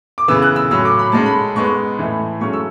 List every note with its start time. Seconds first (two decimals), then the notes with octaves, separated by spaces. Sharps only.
0.18 D6
0.28 C#3 E3 B3 E6
0.42 F#6
0.56 E6
0.71 A2 F#3 C#4 E6
0.85 D6
0.99 B5
1.12 G#2 G#3 C#4 A5
1.26 B5
1.56 G#2 G#3 B3 C#6
1.98 A2 E3 A3
2.41 G#2 F#3 A3 C#4 C#6
2.53 E6